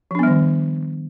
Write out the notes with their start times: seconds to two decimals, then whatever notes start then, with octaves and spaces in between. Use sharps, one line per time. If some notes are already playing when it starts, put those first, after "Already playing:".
0.11 F3
0.15 D4
0.19 B3
0.23 G3
0.27 D#3